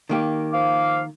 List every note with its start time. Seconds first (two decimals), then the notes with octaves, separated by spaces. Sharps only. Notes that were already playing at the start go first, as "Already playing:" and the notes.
0.09 D#3 A#3 G4
0.53 F3 F5 D6